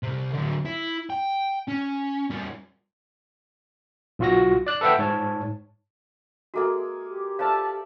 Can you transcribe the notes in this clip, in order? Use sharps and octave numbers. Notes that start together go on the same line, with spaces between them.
C2 C3
D3 F#3
E4
G5
C#4
G3 C#4
B1 F4 F#4 A#6
D5 F#6
A4 B4 E5 F#5 G5
G#2 C#5 A5
G#3 A#3 F#4 G#4 A4 E5
G4
F4 A4 C5 D5 E5 F5 A5